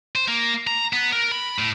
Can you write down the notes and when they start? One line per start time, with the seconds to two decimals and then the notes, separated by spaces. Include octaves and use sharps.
0.16 C5
0.28 A#3
0.67 A#5
0.93 B3
1.12 A#4
1.32 B5
1.59 A2